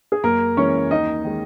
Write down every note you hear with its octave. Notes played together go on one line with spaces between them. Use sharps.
G#4
F#2 A#3 A#4
E3 G#3 C#4 C#5
D#2 D#4 D#5
D#3 G#3